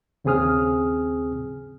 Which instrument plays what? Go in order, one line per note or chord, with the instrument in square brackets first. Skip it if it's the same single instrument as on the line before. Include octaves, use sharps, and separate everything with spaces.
[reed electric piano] D#2 C#3 C4 G#4 D#6 F6